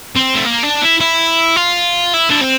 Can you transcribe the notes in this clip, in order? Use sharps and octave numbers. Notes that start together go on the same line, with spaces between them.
C4
A3
A#3
D4
E4
E4
F4
E4
D4
C4